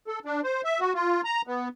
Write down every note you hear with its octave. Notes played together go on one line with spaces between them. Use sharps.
A4
D4
C5
E5
F#4
F4
A#5
B3